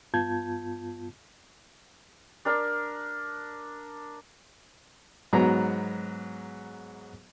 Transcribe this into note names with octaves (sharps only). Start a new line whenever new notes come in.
G2 B3 F4 A5 G6 G#6
D4 A#4 D5
G#2 F#3 B3 A#5